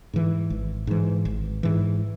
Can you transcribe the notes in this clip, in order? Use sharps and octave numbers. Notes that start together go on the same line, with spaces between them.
G#2 E3
G#1
G#2 E3
G#1
G#2 E3